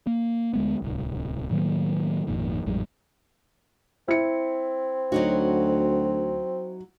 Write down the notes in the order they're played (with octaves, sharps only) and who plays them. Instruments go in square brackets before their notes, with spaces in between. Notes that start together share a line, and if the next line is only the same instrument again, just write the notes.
[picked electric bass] A#3
D2 G#3 B3
D1 C2
A2 D#3 F#3 A#3
G#1 F2 A#2 D#3
A1 F2 G#2 G3
[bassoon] C4 [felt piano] E4 C#7
[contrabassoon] D2 [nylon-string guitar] F#3 D#4 F#4